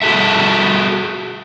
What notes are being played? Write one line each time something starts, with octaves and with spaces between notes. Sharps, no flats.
F#4 G#4 A4 E5